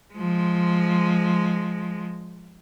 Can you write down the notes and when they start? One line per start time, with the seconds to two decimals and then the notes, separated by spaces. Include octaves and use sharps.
0.14 F3 G#3